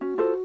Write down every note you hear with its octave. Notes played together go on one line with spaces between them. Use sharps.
C#4 F#4
F4 A4 C5